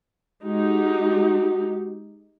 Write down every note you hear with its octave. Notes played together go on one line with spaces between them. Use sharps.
G#3 D#4 F#4 G4